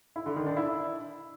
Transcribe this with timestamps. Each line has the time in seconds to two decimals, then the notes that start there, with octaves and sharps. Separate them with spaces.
0.16 E4
0.26 D3
0.36 D#3
0.46 D4
0.57 E4